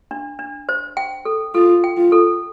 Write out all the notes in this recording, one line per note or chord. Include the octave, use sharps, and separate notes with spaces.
D4
D4
C5
G5
A4
F4 A4
G5
F4
A4